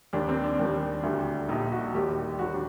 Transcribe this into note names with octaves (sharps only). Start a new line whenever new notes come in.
D#2 D#3 G3 D4
C4
D4
D#2 D#3 G3
D2 D3 G3
A#1 A#2 G3 D#4
F#4
D#2 D#3 G3 G4
D#2 D#3 G3 F#4
D4